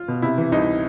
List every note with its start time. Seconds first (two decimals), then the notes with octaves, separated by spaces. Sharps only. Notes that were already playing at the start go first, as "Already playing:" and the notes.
Already playing: F4
0.08 B2
0.22 C3 E4
0.38 E3
0.52 C2 D#4